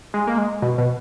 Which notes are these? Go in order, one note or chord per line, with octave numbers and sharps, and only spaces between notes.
G#3
A#3
G#3
B2
B2